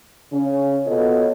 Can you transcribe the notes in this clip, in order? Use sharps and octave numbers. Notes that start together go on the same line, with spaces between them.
C#3 C#4
B2 B3 F4 A4 C#5 D#5